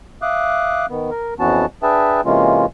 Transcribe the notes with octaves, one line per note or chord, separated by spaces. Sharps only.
E5 F5 D6 D#6 F#6
D#3 B3
A#4
F2 E3 B3 C#4 F#4 A5
D4 G#4 B4 E5 G5 A5
C3 E3 G#3 A#3 C#4 F4